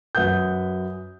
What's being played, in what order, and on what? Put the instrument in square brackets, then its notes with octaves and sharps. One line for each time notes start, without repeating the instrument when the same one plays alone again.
[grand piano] F#2 B4 F#5 D#6 G6